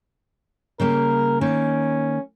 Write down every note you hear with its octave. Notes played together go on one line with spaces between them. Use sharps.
C#3 G3 A#3 A#4
D#3 A#3 C#4